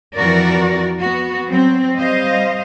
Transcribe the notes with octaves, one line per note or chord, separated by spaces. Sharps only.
F2 E3 F#4 A#4 D5
B3 F#4
F#3 C4
G3 C5 D#5 F5